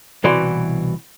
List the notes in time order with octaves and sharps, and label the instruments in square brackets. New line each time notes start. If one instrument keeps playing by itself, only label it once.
[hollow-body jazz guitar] C2 B2 E3 F#4 D5 C6